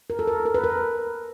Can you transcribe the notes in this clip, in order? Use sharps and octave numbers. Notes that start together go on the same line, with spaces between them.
A#4
A4
A#4
A#4
B4
A#4